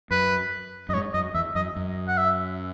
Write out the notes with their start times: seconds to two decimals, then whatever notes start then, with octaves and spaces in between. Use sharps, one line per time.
0.11 F#2 B4
0.89 F#2 D#5
0.93 G#2 C#5
1.14 F#2 D#5
1.34 E2 E5
1.55 F#2 D#5
1.76 F#2
2.08 F#5
2.17 E5